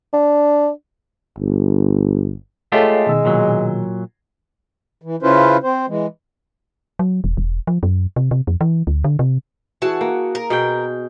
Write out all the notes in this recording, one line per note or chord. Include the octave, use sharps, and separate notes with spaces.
D4
G1
G#3 A3 F4 G4 A4 C#5 F5
B2 D#3 E6
A#2 F#3
E3
C#3 C#4 E4 F4 B4 C5
C4 C5
E3 G#3
F#3
E1
E1
F3
F#2
C3
C3
F2
E3
D2
D3
C3
E3 F#4 G#4 A5
A#3
A#4
B2 G#4 G5